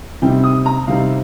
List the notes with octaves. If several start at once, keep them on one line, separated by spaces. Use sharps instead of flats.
C3 G3 C4 D#4 G5
D#6
A#5
C3 G3 C4 D#4 F5